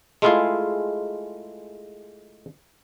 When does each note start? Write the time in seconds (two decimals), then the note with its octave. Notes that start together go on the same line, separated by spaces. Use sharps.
0.22 G#3 A3 E4 F4 G#4 F5